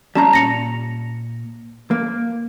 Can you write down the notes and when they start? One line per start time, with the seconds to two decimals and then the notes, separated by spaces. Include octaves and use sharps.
0.15 G3 C#4 A5 A#5
0.33 A#2 A#6 C#7 F7
1.91 A#3